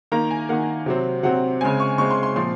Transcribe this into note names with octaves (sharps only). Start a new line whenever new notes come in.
D#3 A#3 A#5
G#5
D#3 A#3 F#5
C3 F#3 C4
C3 F#3 C4 F#5
C#3 G#3 C4 G#5
C#6
C#3 G#3 C4 C#6
C6
C6
A#2 F3 C4 C6